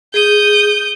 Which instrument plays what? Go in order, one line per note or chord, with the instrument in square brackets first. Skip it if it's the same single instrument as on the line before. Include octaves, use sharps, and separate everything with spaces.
[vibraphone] G#4 [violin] D#6 G6